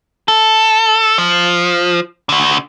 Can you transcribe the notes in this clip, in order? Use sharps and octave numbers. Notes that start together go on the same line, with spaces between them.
A4
F3
D3 F#4